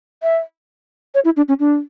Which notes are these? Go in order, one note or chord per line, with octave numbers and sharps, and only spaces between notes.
E5
C#5
E4
D4
C#4
D4